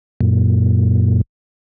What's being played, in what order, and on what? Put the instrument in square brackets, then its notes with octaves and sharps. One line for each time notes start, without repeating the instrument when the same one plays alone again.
[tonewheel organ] F#2 A#2